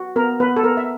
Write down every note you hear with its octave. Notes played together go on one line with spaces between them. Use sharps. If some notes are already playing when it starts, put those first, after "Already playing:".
Already playing: F#4
B3 A#4
B3 B4
A4
B3 A#4
E5